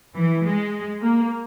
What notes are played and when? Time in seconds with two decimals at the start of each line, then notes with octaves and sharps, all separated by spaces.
0.15 E3
0.44 G#3
1.02 A#3